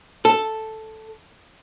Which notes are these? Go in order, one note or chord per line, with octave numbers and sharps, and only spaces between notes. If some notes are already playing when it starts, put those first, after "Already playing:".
A4